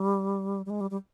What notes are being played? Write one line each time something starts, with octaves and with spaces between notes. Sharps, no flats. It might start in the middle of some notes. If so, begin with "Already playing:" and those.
Already playing: G3
G3
G#3
G3
G3